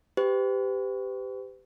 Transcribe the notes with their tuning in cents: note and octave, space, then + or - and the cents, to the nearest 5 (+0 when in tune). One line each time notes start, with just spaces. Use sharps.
G4 +0 B4 +45